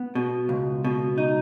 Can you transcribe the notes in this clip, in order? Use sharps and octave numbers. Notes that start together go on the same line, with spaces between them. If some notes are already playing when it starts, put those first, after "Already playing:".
Already playing: B3
B2
C#2
B2
D#4